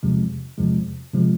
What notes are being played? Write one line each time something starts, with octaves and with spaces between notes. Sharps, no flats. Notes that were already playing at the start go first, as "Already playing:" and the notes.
E2 C3 F3 G#3
E2 C3 F3 G#3
C3 F3 G#3